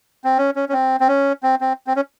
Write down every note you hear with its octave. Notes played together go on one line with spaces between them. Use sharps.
C4
C#4
C#4
C#4
C4
C4
C#4
C4
C4
C4
C#4